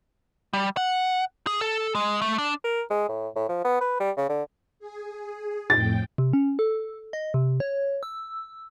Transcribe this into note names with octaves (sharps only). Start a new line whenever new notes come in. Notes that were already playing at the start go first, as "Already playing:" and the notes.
G3
F#5
G#4
A4
G#3
A3
D4
A#4
G#3
A2
A2
F3
B3
B4
G3
C#3
D3
G#4
F2 A2 G5 A6
C3
C#4
A4
D#5
C3
C#5
E6